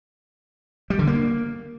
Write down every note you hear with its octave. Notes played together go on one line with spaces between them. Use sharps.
G3
D3
A#3